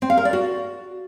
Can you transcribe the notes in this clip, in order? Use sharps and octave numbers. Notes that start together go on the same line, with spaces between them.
C4
F5
A#4
D5
F#4